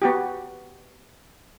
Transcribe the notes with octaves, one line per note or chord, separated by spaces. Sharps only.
B3 F#4 G4